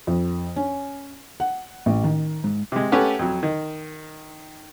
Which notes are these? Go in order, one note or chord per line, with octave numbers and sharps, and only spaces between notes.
F2
C#4
F#5
A1
D#3
G#2
C3 G#3
A3 C#4 G4 A4 B4 F#5
F2 F#3
D#3